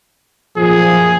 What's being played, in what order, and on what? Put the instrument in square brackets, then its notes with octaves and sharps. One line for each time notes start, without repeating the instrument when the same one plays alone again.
[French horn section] F#2 A#2 F3 [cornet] G#4